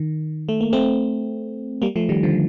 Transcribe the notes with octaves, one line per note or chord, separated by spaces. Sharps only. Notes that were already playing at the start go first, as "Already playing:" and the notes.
Already playing: D#3
A3
A#3
A3 C4
G3 A#3
F3 A3
D#3 G3
D3 F3